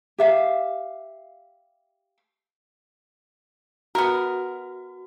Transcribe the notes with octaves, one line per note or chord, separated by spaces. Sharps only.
G4 E5 F5
B3 F#4 A#4